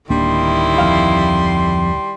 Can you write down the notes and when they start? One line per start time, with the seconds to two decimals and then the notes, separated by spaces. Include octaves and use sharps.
0.10 D1 D#3 G3 A#3 D4 E4 C6
0.78 F2 F5